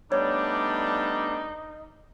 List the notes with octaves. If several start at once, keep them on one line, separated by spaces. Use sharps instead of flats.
G3 A3 B3 D4 D#4 C#5